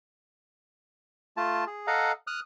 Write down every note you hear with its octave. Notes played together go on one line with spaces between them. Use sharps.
A3 F4 A5
G#4
A4 D#5 F5 F#5 A#5
D#6 F6 F#6